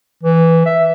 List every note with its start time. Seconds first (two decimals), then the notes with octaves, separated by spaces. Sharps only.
0.23 E3
0.66 E5